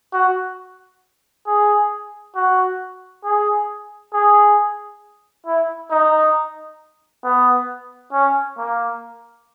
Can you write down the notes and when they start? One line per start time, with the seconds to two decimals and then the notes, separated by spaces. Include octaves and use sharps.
0.13 F#4
1.46 G#4
2.35 F#4
3.24 G#4
4.13 G#4
5.46 E4
5.91 D#4
7.24 B3
8.13 C#4
8.58 A#3